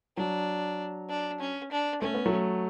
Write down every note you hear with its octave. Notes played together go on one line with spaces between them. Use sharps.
F#3 D4
D4
C#4
D4
A3 C#4
B3
F#3 A3